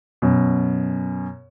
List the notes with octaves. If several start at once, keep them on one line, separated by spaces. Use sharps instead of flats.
F#2 B2